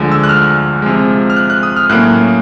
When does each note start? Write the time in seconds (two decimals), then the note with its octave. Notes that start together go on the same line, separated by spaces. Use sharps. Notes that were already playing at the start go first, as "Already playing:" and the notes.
Already playing: D2 D3 F3 G#3
0.12 E6
0.24 F#6
0.29 F6
0.82 C3 F3 G#3
1.30 F6
1.36 F#6
1.50 F#6
1.63 D#6
1.76 F6
1.90 A2 F#3 A#3 C#4 F#6